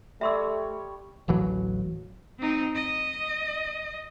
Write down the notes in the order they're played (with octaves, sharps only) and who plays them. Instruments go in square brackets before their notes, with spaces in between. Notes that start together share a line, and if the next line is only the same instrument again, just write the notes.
[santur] G3 C#5 [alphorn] A3 [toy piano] E5 C6 E6
[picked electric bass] D1 A1 E3 F#3
[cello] C4 D#4
D#5